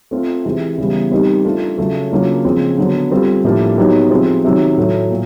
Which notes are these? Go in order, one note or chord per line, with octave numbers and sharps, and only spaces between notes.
A3 C4 F4
C3 E3 G#3
C#3 E3 G3 B3
G3 C4 D#4 G4 A#4
A3 D4 F4
C#3 F#3 A3
C#3 F#3 A#3 D4 F4
C#3 F3 G#3 C4
D3 F#3 B3
G3 C4 F4 A4
A2 F3 A#3 D4 G4
F#3 B3 D#4 G4 A#4
C3 F3 G#3 C4 F4
C3 D#3 F#3
A2 F#3 A3
A#2